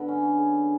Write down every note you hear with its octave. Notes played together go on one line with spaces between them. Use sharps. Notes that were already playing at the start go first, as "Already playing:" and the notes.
Already playing: D3 B3
C#4
G#4